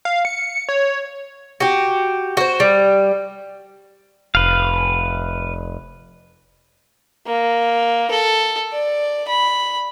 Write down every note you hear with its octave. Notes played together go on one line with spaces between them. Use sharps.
F5
C#7
C#5
F#4 G4
F#4 C5
G3
F1 B4 F5
A#3
A4
D5
B5